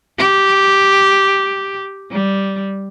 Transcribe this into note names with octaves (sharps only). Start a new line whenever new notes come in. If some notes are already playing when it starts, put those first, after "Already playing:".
G4
G3